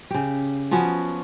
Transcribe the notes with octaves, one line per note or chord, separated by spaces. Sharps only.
C#3 G4
F3 B3 C#4 F#4